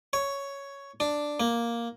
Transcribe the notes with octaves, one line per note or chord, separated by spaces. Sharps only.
C#5
D4
A#3